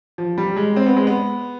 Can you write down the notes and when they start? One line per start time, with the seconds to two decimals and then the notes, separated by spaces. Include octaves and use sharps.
0.18 F3
0.38 G3
0.56 G#3
0.76 C4
0.86 B3
0.97 G#3
1.07 B3